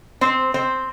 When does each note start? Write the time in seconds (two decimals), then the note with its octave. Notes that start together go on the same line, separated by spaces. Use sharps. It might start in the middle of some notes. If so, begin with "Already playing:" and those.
0.21 C4 C5
0.54 C4 C5